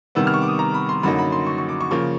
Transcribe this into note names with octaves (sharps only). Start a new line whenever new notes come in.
C3 D#3 G3 B3 E6
F6
C#6
D6
D#6
A#5
B5
C6
F#2 D3 F#3 A#3 D#4 B5
B5
C6
C#6
C#6
D6
C#6
C#3 F3 A#3 C#6